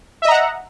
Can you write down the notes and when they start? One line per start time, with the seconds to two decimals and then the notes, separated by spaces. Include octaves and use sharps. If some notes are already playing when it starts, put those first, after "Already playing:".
0.22 E5
0.25 D#5
0.28 A#5
0.32 F#5